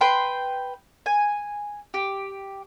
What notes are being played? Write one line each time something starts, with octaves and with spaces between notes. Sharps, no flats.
B4 G5 C6
G#5
G4